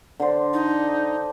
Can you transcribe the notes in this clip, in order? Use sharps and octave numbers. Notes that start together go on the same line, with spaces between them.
D3 D4 C5
D#4